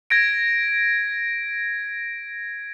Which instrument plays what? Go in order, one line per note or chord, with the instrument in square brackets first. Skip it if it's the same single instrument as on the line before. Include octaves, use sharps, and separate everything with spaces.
[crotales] G#6 A#6 D7